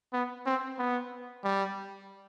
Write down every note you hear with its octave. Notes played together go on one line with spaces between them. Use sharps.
B3
C4
B3
G3